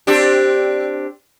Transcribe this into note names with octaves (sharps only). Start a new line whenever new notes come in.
C4 D4 G4